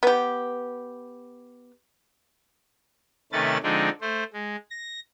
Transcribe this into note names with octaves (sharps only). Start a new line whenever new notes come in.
B3 G4
C3 D#3 A3 C#4 B4 A6
D3 F3 G#3 C4 D4 D#4
A3 C5
G#3
A#6